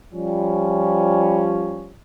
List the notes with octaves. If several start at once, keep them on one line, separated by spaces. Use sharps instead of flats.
F3 G3 C#4